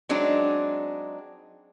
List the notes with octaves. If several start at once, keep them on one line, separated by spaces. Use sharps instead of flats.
F#3 G#3 C4 D4 D#4